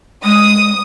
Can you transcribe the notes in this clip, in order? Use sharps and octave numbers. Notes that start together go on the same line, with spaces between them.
G#3 D#6